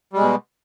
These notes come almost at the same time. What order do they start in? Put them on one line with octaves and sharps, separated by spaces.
G3 G#3 B2